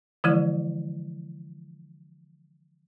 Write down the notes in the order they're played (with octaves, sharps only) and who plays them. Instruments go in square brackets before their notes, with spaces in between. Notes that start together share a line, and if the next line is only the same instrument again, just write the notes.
[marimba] D3 E3 F3 G#3 E4 D5